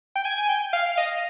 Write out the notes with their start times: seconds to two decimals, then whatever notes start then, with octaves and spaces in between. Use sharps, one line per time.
0.16 G5
0.25 G#5
0.38 G#5
0.49 G5
0.73 F5
0.86 F5
0.98 D#5